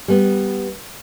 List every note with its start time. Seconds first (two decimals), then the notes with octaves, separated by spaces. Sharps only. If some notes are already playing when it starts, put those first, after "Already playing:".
0.08 G3 B3